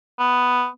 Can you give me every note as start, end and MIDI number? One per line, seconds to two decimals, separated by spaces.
0.19 0.67 59